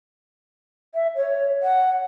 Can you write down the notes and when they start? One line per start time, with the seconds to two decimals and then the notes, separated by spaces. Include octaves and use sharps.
0.94 E5
1.16 C#5
1.63 F#5